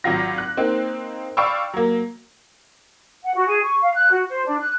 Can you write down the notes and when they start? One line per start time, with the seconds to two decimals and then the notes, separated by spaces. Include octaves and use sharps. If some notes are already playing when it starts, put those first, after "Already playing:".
0.04 G#1 F#3 F4 A#6
0.38 F#6
0.57 A#3 C4 D#4
1.37 D5 F5 G5 B5 C#6 E6
1.74 F#3 A#3
3.23 F#5
3.35 F#4
3.47 G#4
3.63 C#6
3.81 F5
3.94 F#6
4.11 F#4
4.28 C5
4.46 D4
4.59 F#6